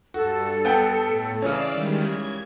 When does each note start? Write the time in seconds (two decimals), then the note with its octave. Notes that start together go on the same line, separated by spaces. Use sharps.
0.14 G2 F#4 A4
0.65 B3 F#5 G5
1.07 A2
1.42 C#3 E3 C#4 D5 F5 E6
1.70 D#3 G3 G#3
2.05 G#6